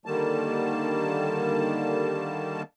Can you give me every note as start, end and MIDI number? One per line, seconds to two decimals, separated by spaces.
0.06 2.62 50
0.06 2.62 51
0.06 2.62 55
0.06 2.62 58
0.06 2.62 81